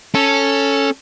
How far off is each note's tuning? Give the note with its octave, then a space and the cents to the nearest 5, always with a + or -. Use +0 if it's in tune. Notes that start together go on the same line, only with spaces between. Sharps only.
C#4 +0 A4 +5